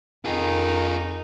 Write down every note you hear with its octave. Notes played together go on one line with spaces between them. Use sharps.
F2 D#3 D#4 F4 G#4